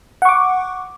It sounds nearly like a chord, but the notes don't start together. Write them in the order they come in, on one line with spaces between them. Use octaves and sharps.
F#5 C#6 D6